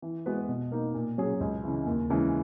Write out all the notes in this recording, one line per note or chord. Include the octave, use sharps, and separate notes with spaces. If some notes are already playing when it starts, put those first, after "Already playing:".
E3
G#3 B3 F#4 B4
B2
A#3 D#4
A#2
F#3 C#4 G#4
C#2
C#3 E3
D#2
C#3 E3 G#3